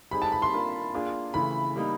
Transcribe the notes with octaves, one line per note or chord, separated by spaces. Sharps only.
G3 C4 D#4 G#4 B5
A5
B5
C6
A#3 D4 F4 A#4
A#3 D4 F4 G#4
C#3 E3 A3 B5
G3 A#3 D#4